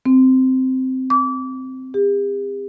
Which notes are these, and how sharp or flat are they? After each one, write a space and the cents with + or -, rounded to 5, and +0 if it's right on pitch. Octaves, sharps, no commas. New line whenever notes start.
C4 -10
D6 -30
G4 +45